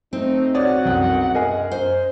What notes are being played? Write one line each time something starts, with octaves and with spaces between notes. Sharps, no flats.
A3 C4 D#4
B1 F#4 C#5 D5 F#5 D#6
C2 F#2 G5
G#4 A#4 D#5
C5